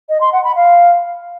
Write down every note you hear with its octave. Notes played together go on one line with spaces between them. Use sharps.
D#5
C6
F#5
B5
F5